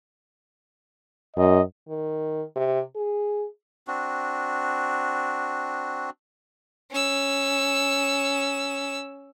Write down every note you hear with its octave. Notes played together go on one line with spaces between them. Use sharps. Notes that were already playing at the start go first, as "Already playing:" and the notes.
F#2 D#5
D#3
C3
G#4
C4 D4 F#4
C#4 E6